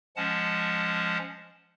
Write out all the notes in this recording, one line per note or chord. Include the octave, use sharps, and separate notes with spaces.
F3 G#3 C#4 F#5 A5